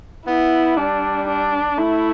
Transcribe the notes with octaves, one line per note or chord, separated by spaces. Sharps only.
B3 E4
G3 D4
D4
A3 E4